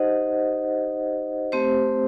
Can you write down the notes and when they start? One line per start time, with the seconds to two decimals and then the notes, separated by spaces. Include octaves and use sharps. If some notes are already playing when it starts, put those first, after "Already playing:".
Already playing: D#4 G4 C5 D#5 F#5
1.52 A3 C4 G4 C5